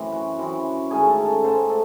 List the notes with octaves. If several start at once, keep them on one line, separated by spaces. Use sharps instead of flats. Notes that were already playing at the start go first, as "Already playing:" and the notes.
Already playing: F#2 A2 E3 C4 E5
F#4
F#2 E3 C4 F#4
G#2 D#3 A3 C#4 G#4
A4
A4
G#2 D#3 A3 C#4 C5
A4